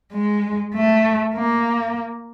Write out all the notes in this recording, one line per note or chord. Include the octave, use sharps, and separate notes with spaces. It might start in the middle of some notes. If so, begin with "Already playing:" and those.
G#3
A3
A#3